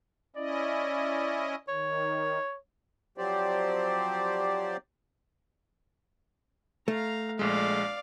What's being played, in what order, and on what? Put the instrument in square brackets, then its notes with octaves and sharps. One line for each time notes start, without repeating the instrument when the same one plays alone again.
[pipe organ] C#4 E4 D#5 [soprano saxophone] D5
[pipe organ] D#3 [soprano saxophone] C#5
[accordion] F3 F#3 C4 G4 C5 D5
[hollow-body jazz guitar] A3 [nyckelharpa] F5 A#5
[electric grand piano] A#1 G#3 [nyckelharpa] D5 F5